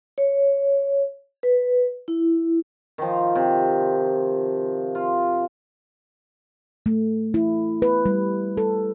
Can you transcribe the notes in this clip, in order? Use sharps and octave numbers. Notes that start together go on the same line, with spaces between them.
C#5
B4
E4
D#3 F3
C3
F4
A3
E4
B4
G3
A4